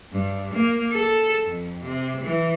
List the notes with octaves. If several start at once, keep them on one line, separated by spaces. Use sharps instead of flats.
G2
A#3
A4
F2
C3
E3